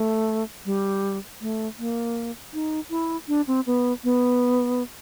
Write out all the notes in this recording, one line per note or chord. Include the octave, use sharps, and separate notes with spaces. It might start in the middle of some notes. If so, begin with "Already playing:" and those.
Already playing: A3
G3
A3
A#3
D#4
E4
D4
C4
B3
B3